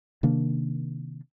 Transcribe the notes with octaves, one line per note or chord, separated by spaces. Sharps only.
C3 D#3 A#3 D4